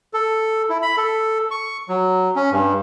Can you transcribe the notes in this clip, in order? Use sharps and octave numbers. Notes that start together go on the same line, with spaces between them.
A4
E4
B5
A4
C#6
F#3
C#4
G2